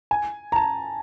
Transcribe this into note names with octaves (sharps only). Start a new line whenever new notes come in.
G#5
A#5
A5